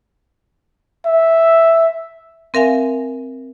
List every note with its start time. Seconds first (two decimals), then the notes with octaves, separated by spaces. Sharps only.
1.06 E5
2.54 C4 A#4 E5 F5 G#5